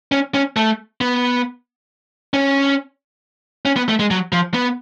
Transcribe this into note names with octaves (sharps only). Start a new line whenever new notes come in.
C#4
C#4
A3
B3
C#4
C#4
B3
A3
G#3
F#3
F3
B3